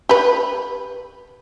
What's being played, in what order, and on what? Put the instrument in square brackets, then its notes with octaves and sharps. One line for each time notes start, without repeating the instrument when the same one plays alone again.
[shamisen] G4 B4